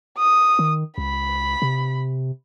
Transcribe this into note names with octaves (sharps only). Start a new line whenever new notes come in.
D#6
D#3
C#2 B5
C3